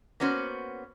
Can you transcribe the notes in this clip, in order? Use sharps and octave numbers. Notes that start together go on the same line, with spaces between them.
A#3 B3 C#4 F#4 B4 C5